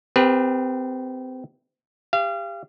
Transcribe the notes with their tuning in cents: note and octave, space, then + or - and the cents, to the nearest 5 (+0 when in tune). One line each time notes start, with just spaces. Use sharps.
C4 -30 G4 +35 B4 -25
G4 +25 F5 -35